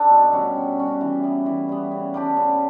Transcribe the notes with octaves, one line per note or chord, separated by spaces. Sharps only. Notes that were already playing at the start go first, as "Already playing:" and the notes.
Already playing: D4 A4
B2
G3 C#4 F#4
B2
G3 C#4 F#4
E3
G3 B3
E3
G3 B3
C#3
G3 D4 G4
C#3